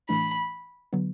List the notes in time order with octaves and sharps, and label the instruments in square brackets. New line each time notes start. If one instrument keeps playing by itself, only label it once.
[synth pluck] A2 E3 A3 D4 [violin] B5
[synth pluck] D3 F#3 B3